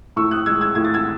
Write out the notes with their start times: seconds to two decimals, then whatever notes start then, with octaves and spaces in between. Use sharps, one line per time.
0.16 A2 C#6 E6
0.31 D#6 F#6
0.46 G#3 E6 G#6
0.61 E6 G#6
0.75 A2 G#6
0.85 A6
0.94 E6 G#6